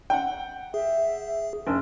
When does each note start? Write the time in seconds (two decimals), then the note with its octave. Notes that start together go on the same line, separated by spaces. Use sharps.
0.10 F#5 G5
0.74 G#4 E5
1.67 F#1 D4